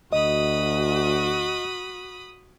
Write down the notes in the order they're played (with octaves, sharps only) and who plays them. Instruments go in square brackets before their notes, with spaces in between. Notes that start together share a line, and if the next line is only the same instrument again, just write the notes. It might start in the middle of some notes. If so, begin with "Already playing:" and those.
[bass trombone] D2 [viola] F#4 [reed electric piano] D#5 [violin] B5 D#6